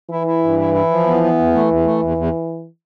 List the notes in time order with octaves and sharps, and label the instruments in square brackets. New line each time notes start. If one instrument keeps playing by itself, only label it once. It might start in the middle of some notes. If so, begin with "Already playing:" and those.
[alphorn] E3 [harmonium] E4
[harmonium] E4
G2
E4
E4
F3
B3
B3
E2
A3
E2
A3
E2
E2